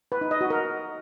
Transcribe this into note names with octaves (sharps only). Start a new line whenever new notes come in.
B4
D#4
D#5
F#4
A#4